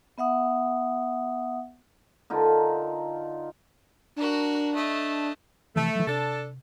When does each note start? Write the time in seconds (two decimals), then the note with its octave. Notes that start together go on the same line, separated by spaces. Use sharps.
0.18 B3 E5 F#5 D#6
2.30 D3 D#4 F4 A#4
4.16 D4 F#4 A#4
4.74 A3 D#5
5.76 C3 E3 F3 A3
5.95 E3 F#3
6.07 C3 D4 A4